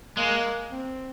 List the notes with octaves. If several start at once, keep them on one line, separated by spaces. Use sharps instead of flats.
G#3 A#3
C4